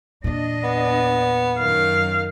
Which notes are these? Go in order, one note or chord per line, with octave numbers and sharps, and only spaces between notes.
E2 A#2 D4 D#5
B3
F#2 D#3 F5